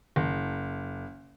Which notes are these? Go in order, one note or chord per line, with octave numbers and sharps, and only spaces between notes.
F#1